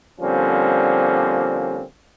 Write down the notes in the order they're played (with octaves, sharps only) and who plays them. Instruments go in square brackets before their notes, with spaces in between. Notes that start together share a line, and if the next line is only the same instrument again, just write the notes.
[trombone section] D3 F3 G3 A#3 C4 C#4